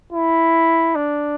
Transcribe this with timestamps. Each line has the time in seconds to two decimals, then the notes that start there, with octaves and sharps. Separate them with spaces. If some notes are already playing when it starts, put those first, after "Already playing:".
0.13 E4
0.95 D4